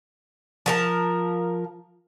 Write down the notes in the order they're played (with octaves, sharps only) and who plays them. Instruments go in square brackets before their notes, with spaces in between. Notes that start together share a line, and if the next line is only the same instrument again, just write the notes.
[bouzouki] F3 A#4 A5